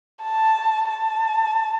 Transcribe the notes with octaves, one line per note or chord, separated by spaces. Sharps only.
A5
A5